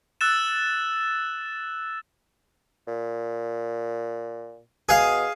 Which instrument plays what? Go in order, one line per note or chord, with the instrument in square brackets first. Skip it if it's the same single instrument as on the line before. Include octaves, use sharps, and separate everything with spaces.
[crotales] E6 F#6 A6 E7
[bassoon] A#2
[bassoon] B2 [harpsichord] G#4 F5